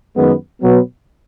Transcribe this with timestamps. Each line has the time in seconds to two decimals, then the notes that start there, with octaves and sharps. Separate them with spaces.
0.15 F#2 D#3 G#3 B3
0.62 B2 F#3 B3